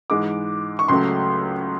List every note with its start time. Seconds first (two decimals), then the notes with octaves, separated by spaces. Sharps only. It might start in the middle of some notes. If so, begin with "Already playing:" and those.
0.10 G#2 E3 G#3 D6
0.79 C#6
0.88 C#2 C#3 F#3 A3 C6